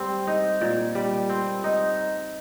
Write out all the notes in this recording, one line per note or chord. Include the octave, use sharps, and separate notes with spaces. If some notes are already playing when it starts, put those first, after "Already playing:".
Already playing: G3 C4
D#4
A#2
G3
C4
D#4